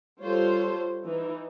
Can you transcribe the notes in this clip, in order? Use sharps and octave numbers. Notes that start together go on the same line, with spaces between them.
G3 F4 A4 C5 C#5
E3 D#4